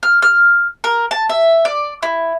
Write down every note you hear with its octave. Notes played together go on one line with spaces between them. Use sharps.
F6
F6
A#4
A5
E5
D5
E4